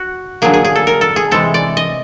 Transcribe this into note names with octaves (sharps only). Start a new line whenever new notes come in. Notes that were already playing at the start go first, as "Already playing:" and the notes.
Already playing: F#4
D3 F#3 A#3 G#4
G#4
G#4
A4
A#4
A4
G#4
C3 E3 G#3 A4
D5
D#5